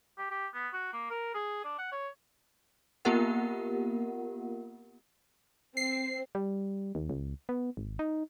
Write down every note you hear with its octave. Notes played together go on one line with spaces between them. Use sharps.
G4
G4
B3
F#4
A#3
A#4
G#4
D4
F#5
C#5
A#3 B3 F4 G4 A#4 F#5
C4 C7
G3
D#2
C#2
B3
G#1
D#4